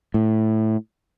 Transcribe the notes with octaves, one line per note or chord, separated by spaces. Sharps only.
A2